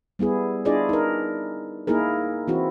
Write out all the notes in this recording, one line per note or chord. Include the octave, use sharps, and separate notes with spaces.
G3 B3 E4 G#4
D4 E4 F4 G#4 D5 D#5
D#4 A#4
A#3 D#4 E4 G#4 A#4
E3 C4 E4 F#4